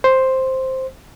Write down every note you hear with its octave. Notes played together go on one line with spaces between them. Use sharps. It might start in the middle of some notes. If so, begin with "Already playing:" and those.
C5